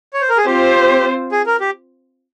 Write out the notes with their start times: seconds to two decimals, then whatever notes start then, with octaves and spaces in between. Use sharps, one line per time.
0.14 C#5
0.21 C5
0.29 A#4
0.38 G#4
0.46 C4 F4 G4 C5
1.32 G#4
1.46 A#4
1.60 G4